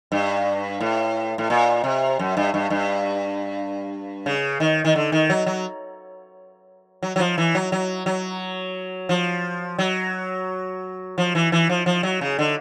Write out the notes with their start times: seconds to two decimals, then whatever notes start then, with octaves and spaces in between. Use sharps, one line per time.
0.12 G2
0.80 A2
1.38 A2
1.50 A#2
1.84 C3
2.19 F#2
2.37 G2
2.54 G2
2.70 G2
4.26 C#3
4.60 D#3
4.85 D#3
4.96 D3
5.12 D#3
5.30 F#3
5.46 F#3
7.03 F#3
7.16 F#3
7.20 F3
7.38 E3
7.55 F#3
7.72 F#3
8.06 F#3
9.09 F3
9.78 F#3
11.18 F3
11.35 E3
11.52 E3
11.69 F3
11.86 F3
12.03 F#3
12.21 C#3
12.39 D3